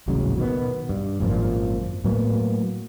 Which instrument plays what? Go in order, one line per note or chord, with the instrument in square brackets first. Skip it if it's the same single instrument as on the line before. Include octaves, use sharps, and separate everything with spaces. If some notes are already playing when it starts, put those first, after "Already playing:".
[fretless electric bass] D#1 A1 C#3 F#3
B2 D#3 B3
G2
G#1 F#2 A#2 F3
A2 F#3 A#3 B3